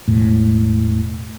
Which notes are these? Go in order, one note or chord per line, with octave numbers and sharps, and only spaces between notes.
E1 A2